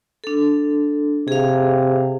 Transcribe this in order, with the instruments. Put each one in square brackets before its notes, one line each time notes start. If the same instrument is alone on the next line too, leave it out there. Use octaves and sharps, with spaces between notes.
[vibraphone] D4 A4
[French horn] C3 [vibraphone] G#4 F5